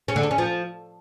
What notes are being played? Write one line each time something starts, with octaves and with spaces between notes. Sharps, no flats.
C#4
D3
D4
C#4
F3